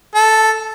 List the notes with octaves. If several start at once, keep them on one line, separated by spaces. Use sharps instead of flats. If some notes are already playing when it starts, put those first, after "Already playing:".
A4